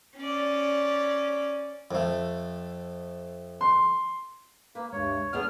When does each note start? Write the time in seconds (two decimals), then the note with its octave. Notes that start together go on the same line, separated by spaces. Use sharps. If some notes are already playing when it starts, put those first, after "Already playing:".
0.17 C#4 D5
1.91 F2 A3
3.61 C6
4.75 A#3 B4
4.92 D2 G2 C3 G#3 C#5
5.33 D3 B3 G#4 F6